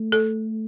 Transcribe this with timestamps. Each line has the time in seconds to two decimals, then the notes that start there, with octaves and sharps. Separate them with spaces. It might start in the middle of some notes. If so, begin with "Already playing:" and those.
Already playing: A3
0.12 A4